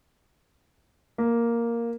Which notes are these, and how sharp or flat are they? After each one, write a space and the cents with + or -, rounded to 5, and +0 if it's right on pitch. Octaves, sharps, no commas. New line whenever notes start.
A#3 +0